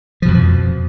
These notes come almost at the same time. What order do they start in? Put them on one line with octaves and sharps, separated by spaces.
F3 B2 F2